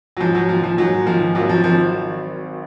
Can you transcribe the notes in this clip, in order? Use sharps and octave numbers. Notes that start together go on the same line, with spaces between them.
F#3
G#2 F3
F#3
D#3 F3 A#3
F3
G#2 F#3
D#3 F3 A#3
G#1 F#3
F3
D#3 F3 F#3 C4